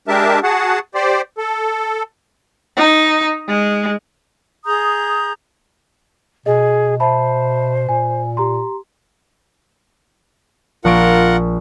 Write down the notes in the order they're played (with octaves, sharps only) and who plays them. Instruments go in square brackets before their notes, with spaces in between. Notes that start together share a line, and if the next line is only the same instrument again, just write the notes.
[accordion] G#3 D4 G4 A#4 E5 A5
F#4 G#4 F#5 A5
G4 C5 D5
A4
[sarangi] D#4
G#3
[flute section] G#4 A#5 D#6 G6
[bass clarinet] B2 [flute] G#4 [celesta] D#5
[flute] C5 [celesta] E5 A5 B5
[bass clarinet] A#2 [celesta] G#5
[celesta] G4 A#5 C6
[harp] A#1 C#6 D7 [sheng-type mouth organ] F4 A#4 F#5